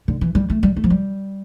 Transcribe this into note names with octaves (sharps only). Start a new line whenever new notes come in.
D3
E3
G3
A3
G3
A3
F3
G3